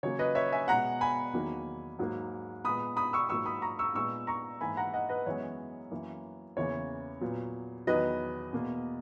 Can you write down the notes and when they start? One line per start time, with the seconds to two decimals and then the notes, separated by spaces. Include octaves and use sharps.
0.03 C#3 F#3 A#3 C#5
0.19 B4 D#5
0.35 C#5 E5
0.52 E5 G#5
0.68 B2 G#3 B3 F#5 A#5
1.01 G#5 B5
1.33 E2 D#3 F#3 A#3
1.99 G#2 F#3 A#3
2.64 A#2 G#3 B3 B5 D#6
2.96 B5 D#6
3.13 C#6 E6
3.29 G#2 F#3 A#3 C#6 E6
3.46 B5 D#6
3.62 A#5 C#6
3.79 C#6 E6
3.95 A#2 G#3 B3 C#6 E6
4.27 A#5 C#6
4.61 G#2 E3 A#3 G#5 B5
4.77 F#5 A#5
4.93 D#5 F#5
5.09 B4 D#5
5.26 F#2 E3 G#3 B3 C#5
5.91 F#2 E3 A#3
6.57 E2 C#3 E3 A#3 C#5
7.21 A#2 F#3 B3
7.87 E2 D#3 F#3 B4 D#5
8.53 E2 B2 A#3